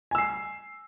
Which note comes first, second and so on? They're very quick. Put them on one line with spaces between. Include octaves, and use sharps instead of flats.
G#5 E6 C7